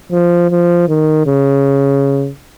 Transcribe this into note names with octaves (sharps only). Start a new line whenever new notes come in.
F3
F3
D#3
C#3